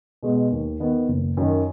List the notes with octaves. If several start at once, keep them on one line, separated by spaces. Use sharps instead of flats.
B2 G#3 B3
D#2
D#3 B3
F#1
F#2 D#3